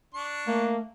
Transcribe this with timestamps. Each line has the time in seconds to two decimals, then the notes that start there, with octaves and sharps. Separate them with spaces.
0.14 D4 C#6
0.47 A3 A#3